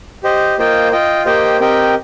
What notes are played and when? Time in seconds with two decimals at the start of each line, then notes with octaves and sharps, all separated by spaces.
0.23 G4 C5 D#5
0.58 A#3 F4 C5 D#5 G5
0.92 F4 D#5 G5
1.26 A#3 G4 C5 D#5 G5
1.60 C4 G4 A#4 D#5 G5